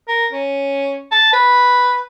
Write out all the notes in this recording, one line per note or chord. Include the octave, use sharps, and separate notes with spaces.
A#4
C#4
A5
B4